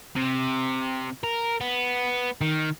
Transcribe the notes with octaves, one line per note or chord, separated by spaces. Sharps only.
C3
A#4
B3
D#3